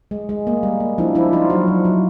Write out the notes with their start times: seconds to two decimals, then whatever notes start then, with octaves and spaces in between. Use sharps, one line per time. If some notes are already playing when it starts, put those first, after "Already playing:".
0.11 G#3
0.29 G#3
0.47 A#3
0.63 G3
0.80 A#3
0.98 F3 D4 E4
1.15 F3 D4 E4
1.33 F3 D#4 F4
1.50 F#3 E4 F#4
1.68 F#3
1.85 F#3